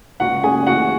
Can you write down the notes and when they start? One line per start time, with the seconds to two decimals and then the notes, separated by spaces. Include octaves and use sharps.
0.20 C#2 F#4 F#5
0.43 C#3 G#4 G#5
0.67 E3 F#4 F#5